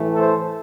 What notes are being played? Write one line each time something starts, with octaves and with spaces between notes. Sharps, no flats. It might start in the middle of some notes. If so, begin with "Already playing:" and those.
Already playing: A2 E3 A3
A4 C5